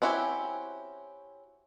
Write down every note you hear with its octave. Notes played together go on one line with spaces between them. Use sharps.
C4 C#4 E4 F#4 G4